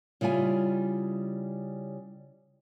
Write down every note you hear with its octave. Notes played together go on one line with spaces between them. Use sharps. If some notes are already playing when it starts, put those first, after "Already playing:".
C#3 G3 E4 F4 G#5